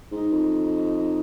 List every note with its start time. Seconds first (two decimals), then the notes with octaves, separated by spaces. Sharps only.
0.11 G#2 D#4
0.32 F2